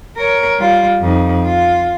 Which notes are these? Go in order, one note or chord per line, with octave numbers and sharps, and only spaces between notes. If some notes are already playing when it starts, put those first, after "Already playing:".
A#4 C#5
G3 F4
F2 D#4
F4